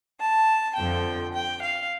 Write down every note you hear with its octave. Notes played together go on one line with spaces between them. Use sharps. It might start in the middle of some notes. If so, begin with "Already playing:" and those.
A5
F2 D3 F3 G5
G5
F5